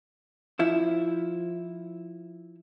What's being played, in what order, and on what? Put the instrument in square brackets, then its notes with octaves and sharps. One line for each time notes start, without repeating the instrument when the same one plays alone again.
[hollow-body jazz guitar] F3 E4